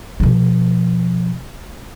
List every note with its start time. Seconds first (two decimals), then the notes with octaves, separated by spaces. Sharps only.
0.20 B2 F3